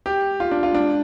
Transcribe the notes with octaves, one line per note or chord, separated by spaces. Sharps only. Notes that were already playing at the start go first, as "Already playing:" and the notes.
G4
F4
D4
F4
D4